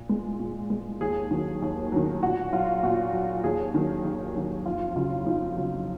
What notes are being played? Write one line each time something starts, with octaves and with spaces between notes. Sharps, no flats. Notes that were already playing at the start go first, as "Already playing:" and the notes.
Already playing: A#2
G#3
A#2
G#3
D#2 G#4
D#3 F#3
D#2
D#3 F#3
A#2 F#4
F#3 F4
A#2 F#4
F#3
D#2 G#4
D#3 F#3
D#2
D#3 F#3
F2 F4
C#3 F#3 F4
F2 D#4
C#3 F#3